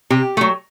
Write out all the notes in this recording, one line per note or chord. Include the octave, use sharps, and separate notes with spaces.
C3 G4
F#3 A3